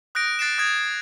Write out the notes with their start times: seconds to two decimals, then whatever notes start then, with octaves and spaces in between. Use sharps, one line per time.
0.15 D#6 F#6 G6 A#6 D7
0.39 F#6 A6 C7 D7 E7
0.58 D#6 G#6 A#6